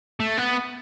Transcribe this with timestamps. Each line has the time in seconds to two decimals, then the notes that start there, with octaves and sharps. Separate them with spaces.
0.20 A3
0.38 B3